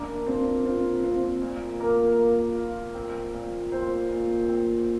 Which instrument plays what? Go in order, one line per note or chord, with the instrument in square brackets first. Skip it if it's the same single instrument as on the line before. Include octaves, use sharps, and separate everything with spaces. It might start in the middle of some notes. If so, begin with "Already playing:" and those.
Already playing: [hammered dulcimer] A#3 [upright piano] D4
[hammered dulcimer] A#2 [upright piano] C4
[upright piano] C4 [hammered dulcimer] F4
[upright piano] C4 [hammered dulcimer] F4
[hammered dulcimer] A#2
[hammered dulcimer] A#3 [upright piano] A#4
[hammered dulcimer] A#3
F4
C4
A#2
[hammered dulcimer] C4 [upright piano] C5
[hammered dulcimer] A#2
C4